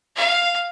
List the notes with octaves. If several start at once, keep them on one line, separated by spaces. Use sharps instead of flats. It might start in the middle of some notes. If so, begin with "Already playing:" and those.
F5